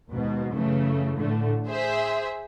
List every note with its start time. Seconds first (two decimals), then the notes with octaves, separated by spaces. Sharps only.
0.10 D#2 G#2 B2
0.53 F#2 C#3 E3 A3
1.16 A2 D3 A3
1.68 G#4 C5 E5